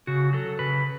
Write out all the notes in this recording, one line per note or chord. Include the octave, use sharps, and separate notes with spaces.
C#3 F#4
F#3 A4
C#3 B4